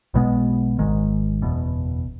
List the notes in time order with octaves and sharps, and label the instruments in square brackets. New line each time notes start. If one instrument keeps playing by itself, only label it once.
[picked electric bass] B1 B2 G#3 B3
G#1 G#2 D#3 G#3
F#1 E2 B2